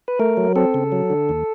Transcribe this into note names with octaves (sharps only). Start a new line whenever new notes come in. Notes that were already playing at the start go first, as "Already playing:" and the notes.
B4
A3 A#4
F#3
C4 A4
C#3
F#3
D3
D#2